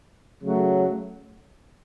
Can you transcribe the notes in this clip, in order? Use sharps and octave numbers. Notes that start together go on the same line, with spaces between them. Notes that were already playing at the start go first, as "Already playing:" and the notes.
C#3 F#3 A3